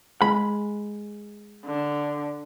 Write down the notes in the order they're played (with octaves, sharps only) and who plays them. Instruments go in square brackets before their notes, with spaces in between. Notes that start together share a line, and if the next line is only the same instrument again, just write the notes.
[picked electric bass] G#3 [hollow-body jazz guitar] B5
[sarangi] D3